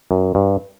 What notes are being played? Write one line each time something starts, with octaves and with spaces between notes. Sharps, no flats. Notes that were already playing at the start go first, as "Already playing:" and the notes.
F#2
G2